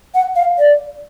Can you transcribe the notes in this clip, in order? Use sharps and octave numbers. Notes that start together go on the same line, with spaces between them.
F#5
F5
D5